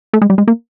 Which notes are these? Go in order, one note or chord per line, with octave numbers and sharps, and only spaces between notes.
A3
G#3
G3
G#3
A#3